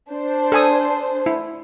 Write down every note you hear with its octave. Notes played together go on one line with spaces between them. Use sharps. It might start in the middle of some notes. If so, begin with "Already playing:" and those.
D4 C5
A4 G#5 D#6
E4